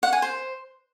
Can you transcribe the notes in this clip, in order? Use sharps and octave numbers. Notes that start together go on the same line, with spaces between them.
F#5
G#5
C5